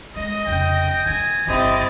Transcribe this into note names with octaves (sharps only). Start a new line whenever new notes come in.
G#3 D#5 A#6
F1 C#3 G5
D#3 G#5
G1 C3 C4 E4 G4 D#5 A6